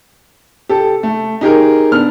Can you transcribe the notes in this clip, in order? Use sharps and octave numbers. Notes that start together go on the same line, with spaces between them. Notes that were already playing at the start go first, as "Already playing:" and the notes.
G4 A4
A3
D#4 G4 G#4 A#4
B3 D4 F6